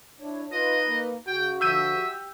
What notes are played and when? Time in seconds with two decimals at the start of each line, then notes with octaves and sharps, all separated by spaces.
0.21 D4 E4 C#5
0.52 D#4 F4 B4 D#5
0.88 A#3
1.27 C#3 F#4 G5
1.61 D3 F3 E5 E6 G6 D#7
1.94 G4